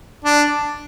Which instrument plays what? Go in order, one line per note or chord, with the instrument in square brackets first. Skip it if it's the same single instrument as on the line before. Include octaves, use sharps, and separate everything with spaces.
[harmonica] D4